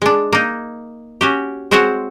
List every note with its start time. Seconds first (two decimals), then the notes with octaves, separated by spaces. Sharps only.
0.02 G#3 D4
0.33 A#3 D#4
1.21 C#4 F#4 G4
1.71 G#3 C4 F#4 C5 C#5 F#5